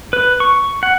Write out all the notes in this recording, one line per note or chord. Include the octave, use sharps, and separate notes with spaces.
B4
C#6
F#5